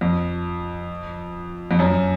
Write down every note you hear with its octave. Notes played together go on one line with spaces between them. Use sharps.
F2
F2
F#2